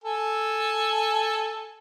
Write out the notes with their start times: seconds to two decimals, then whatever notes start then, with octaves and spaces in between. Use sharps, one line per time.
0.04 A4 G#5